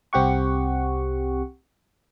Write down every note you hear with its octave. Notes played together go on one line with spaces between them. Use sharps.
C2 C4 G4 F#5 C#6